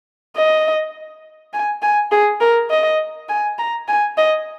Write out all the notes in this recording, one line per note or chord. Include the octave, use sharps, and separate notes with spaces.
D#5
G#5
G#5
G#4
A#4
D#5
G#5
A#5
G#5
D#5